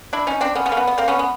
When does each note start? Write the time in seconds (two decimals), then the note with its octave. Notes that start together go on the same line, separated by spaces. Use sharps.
0.13 D4 E4
0.27 C#4 D#4
0.41 C4 D4
0.55 B3 C#4
0.66 B3 C#4
0.72 A#3
0.77 B3
0.87 B3
0.98 A#3 C4
1.08 B3 C#4
1.19 B3